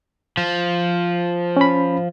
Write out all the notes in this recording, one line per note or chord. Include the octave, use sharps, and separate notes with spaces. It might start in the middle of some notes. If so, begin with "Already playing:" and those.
F3
C#4 B5